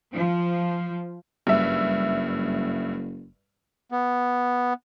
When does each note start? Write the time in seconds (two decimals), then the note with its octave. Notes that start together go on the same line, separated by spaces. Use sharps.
0.12 F3
1.47 F#1 G2 E5
3.92 B3